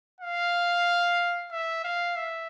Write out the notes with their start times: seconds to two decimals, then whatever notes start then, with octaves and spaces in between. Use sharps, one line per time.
0.21 F5
1.51 E5
1.84 F5
2.16 E5